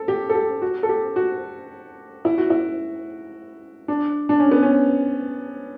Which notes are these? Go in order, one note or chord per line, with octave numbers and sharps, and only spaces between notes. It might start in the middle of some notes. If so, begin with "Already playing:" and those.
Already playing: A4
G4
A4
G4
F#4
A4
G4
F#4
E4
F#4
E4
D4
D4
C#4
B3
C#4